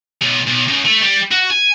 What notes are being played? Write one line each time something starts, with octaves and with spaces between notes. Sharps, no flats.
B1
B1
F#2
A3
G3
F#4
G#5